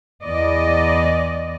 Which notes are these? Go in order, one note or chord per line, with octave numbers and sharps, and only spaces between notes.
E2 D5 D#5